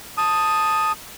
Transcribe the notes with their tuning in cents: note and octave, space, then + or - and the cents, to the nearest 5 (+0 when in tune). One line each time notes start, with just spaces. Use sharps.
A5 +0 D#6 +0